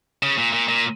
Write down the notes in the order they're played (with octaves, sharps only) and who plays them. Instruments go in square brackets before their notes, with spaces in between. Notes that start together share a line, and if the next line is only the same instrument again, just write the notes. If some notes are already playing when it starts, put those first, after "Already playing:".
[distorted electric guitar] C#3
A#2
A#2
A#2